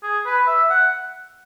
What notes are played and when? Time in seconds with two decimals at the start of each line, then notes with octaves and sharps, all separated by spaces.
0.03 G#4
0.26 B4
0.47 E5
0.70 F#5